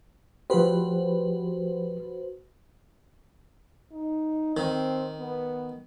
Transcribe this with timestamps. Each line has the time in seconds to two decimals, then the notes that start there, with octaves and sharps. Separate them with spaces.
0.50 F3 F#4 G4 B4 C5
3.91 D#4
4.57 D#3 C4
5.20 B3